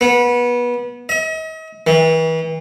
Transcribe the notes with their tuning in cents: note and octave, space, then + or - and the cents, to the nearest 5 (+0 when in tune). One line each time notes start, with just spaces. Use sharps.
B3 -25
D#5 +40
E3 -40